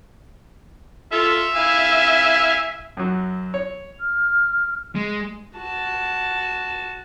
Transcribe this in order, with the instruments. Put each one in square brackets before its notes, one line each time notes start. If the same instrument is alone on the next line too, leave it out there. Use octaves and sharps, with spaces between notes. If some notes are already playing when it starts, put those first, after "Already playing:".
[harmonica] F4 A4 [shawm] E5
[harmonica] E4 F5 G#5
[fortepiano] F#2 F#3
C#5
[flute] F6
[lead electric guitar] G#3
[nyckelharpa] F#4 A5